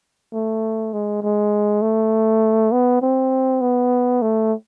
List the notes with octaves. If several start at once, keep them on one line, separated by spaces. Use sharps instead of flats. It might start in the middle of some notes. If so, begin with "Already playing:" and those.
A3
G#3
G#3
A3
B3
C4
B3
A3